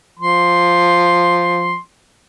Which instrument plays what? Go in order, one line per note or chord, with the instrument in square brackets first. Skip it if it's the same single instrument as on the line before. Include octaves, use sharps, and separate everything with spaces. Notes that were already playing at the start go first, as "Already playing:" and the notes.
[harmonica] F3 C6